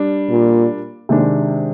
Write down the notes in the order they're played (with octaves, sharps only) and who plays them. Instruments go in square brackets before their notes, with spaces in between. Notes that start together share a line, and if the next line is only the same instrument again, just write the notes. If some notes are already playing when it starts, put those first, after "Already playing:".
Already playing: [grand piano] G3 D4
[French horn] A#2
[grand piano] C3 D#3 G#3 D4